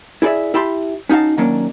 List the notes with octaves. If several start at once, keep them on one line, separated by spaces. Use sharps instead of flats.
E4 G#4 A4 D5 E5
E4 G4 A5 B5 C6
C#4 D#4 F#4 F5 A5
D#3 F#3 A#3 C#4 D4